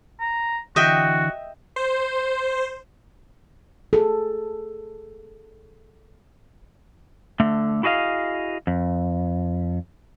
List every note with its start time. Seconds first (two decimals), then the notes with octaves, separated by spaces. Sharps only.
0.21 A#5
0.76 D3 E3 F#4 D#5 E5 G5
1.76 C5
3.93 G#4 A4
7.40 D3 A3
7.83 E4 F#4 G#4 D#5 F5
8.67 F2